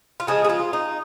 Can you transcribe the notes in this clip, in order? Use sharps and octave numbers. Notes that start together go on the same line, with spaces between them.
F4
C#3 F3 G#3 G#4
G#4
F4
D#4